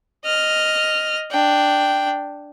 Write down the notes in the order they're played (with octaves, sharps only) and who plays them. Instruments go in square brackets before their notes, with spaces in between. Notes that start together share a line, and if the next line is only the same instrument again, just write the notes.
[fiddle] D#5 F6
D4 G5